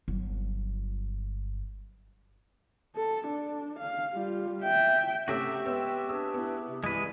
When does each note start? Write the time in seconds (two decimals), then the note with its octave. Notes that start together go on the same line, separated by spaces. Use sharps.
0.08 G1 F#3
2.96 A4
3.28 D4
3.79 F5
4.13 G3 F4
4.63 E5 G5
5.28 C3 A3 C#4 F#4 G4 E5
5.65 G#3 B3 C4 C#5 E6
6.09 D4 G#4 B4 E6
6.34 B3 E4
6.66 C3
6.84 C2 E3 G#3 G#4 B4